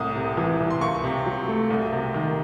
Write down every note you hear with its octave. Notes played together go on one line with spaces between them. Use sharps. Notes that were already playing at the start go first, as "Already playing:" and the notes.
Already playing: C2 A2 D#6
C3
E3
C2
C6
C#2 C#6
C3
F#3
A3
C2
C3
D#3